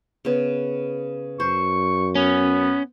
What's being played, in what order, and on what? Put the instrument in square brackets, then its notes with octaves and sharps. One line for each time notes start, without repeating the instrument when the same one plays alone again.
[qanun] C#3 B3
[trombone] F#2 [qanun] C5 [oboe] C#6
[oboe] B3 [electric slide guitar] C#4